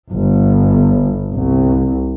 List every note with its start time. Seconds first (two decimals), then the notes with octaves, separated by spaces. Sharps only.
0.12 G1
1.33 C2